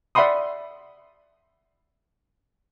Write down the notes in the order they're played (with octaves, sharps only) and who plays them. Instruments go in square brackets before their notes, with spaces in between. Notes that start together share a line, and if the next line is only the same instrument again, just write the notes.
[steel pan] D5 E5 F#5 B5 C6 D#6